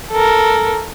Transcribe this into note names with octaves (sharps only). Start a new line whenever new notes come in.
A4 A#4